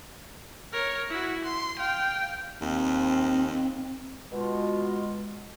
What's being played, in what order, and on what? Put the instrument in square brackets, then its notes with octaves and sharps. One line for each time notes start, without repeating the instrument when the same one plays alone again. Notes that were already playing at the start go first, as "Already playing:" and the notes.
[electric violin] A#4 C#5
E4 F#4
C6
F5 G5
[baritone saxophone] D#2 [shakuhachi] C4
[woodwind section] B2 G#3 F4 F#4